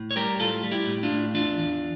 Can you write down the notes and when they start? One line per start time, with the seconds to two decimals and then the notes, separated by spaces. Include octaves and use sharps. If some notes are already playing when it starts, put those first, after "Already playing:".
Already playing: A2
0.11 C#5
0.16 G3 G4 A#4
0.40 A2 F4 A4
0.63 G3
0.71 E4 G4
0.87 A2
1.03 D4 F4
1.11 A2
1.34 E2 D4 F4
1.58 E2